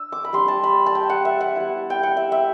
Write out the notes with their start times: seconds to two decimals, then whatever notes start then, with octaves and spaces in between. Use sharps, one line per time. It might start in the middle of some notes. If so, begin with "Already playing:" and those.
Already playing: D4 E6
0.12 D6
0.25 B5
0.33 G3 D4 C6
0.48 A5
0.64 B5
0.86 A5
0.95 G5
1.10 F#5
1.25 E5
1.41 F#5
1.56 G3 B3 E4
1.90 G5
2.03 F#5
2.17 E5
2.32 E5